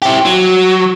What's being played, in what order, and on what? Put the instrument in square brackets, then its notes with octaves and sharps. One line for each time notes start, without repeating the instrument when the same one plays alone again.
[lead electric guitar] E4 G4
F#3